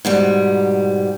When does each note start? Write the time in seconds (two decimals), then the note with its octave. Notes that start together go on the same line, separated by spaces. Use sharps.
0.05 G#2 B2 G3